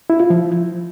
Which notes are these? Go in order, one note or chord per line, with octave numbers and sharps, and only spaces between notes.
E4
F4
F3